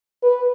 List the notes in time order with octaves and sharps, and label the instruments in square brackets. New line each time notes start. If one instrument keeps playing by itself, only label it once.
[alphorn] B4